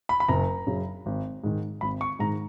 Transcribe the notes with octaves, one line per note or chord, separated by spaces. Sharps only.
B5
B5
F#1 A#5
F#2 C#3
G#1
G#2 D#3
G#1 B5
C#6
G#2 D#3 A#5